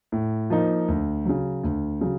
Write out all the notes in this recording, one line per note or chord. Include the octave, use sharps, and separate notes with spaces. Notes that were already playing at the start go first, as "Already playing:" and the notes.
A2
F3 A#3 D#4
D2
C#3 F#3
D2
C#3 F#3